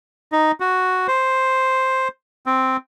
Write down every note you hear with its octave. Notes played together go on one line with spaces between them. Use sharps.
D#4
F#4
C5
C4